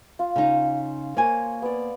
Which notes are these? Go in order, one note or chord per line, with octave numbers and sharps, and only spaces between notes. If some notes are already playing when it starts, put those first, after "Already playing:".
F4
C#3 D#4
A#3 C5 C#5 G#5
B3 D5